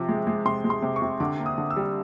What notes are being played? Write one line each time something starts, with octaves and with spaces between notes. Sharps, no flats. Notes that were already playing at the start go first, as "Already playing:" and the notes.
Already playing: C3 F3
G#3
G#3
C3 C6
G#3
C6
C3
C#6
C3
D3 D6
A#3
D#6
D3
E6
G3